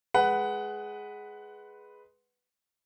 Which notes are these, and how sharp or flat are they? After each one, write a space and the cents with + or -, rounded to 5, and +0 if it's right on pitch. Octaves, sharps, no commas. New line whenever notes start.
G#3 +10 B4 +0 F#5 +15